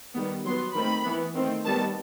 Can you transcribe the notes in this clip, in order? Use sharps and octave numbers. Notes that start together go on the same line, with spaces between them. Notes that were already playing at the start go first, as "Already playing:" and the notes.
D#3 G3 B3
F#3 B3 C6
D#3 A3 C4 B5
E3 B3
D#3 A3 C4
D#3 G3 B3 A5